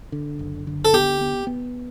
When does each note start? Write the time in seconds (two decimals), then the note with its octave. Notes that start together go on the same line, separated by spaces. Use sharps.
0.12 D3
0.39 F#1
0.67 D3
0.85 A4
0.93 B3 G4
1.21 B3
1.47 B3